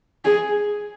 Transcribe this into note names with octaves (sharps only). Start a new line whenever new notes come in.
G#4